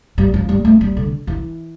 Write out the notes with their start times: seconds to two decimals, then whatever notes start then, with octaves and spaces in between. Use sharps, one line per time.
0.18 G3
0.34 F3
0.49 G3
0.65 A3
0.81 G3
0.97 D3
1.27 E3